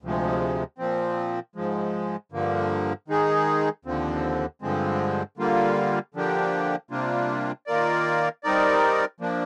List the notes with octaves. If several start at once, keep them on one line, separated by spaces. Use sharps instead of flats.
D2 C3 F3 G#3
A#2 F3 C4
G#2 F3 G#3
G2 D3 F3 A#3
D#3 G#3 D#4 G#4
D#2 D3 F3 C4
G2 D3 F3 G#3 C4
D3 G3 A#3 F4
D3 F3 A#3 D4 G4
C3 G3 A#3 D4 F4
D#3 A#3 F4 A#4 D5
G3 C4 D#4 A#4 D5
F3 A#3 D4